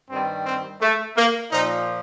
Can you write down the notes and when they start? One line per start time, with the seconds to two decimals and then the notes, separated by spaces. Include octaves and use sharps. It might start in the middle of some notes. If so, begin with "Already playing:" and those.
0.10 G2 D#3 G3 C4
0.45 C4
0.81 A3
1.17 A#3
1.52 A#2 F3 D#4